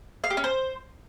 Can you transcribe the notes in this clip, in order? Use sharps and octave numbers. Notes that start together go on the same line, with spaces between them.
F5
G4
C#4
C5